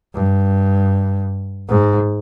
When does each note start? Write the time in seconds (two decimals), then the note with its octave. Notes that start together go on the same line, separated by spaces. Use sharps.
0.14 G2
1.69 G#2